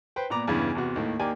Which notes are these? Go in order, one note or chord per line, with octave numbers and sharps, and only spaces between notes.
B4 C5 G5
A#2 B3 D5 A#5 D6
E2 G2 C#3 E3
E2 C3 F#4
D#2 A2
D#2 A#3 G4 D5 G#5